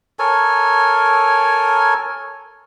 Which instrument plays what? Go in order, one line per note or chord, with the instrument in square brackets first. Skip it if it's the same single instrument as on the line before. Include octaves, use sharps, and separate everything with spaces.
[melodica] A4 A#4 C#5 G#5